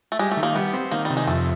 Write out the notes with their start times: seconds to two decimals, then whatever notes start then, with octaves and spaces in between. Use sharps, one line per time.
0.12 A3
0.19 G3 G#3
0.31 A3
0.37 D#3
0.43 A#3
0.55 G3 B3
0.73 C4
0.91 D#3 A#3
1.05 C3 G3
1.17 G#3
1.27 F2 A3